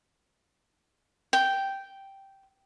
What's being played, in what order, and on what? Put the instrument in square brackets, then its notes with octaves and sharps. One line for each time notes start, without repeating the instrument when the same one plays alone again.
[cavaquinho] G5